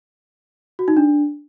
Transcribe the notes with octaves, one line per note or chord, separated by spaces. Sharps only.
F#4
D#4
D4